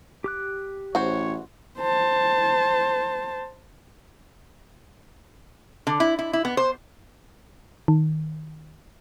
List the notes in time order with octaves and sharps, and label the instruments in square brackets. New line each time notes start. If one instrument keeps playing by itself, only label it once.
[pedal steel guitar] G4 D6 F#6
[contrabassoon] A1 [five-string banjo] F#4 C5 [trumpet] C#5
[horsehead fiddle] C5 A5
[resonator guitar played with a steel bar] D3
E4
E4
E4
B3
C5
[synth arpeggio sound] D#3